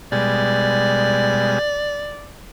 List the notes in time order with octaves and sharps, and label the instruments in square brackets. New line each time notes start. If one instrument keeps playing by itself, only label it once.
[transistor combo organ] B2 G3 G#3 [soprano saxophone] D5